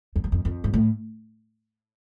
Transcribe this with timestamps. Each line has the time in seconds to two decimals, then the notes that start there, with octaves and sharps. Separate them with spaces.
0.16 F2
0.24 F#2
0.32 F2
0.45 F2
0.64 G#2
0.74 A2